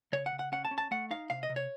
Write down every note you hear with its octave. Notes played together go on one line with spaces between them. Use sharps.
C#3 C#5
F#5
C#3
F#5
C#4 F#5
A5
C#4
A5
A3 F#5
D#4 F5
C3 F5
D#5
C3
C#5